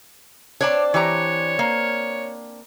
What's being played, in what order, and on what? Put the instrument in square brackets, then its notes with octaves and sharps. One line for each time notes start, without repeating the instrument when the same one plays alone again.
[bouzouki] C4 D4 [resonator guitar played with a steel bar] C#5 D5 A5
[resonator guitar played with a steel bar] E3 G4 A#5 [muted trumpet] C#5
[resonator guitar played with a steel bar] A#3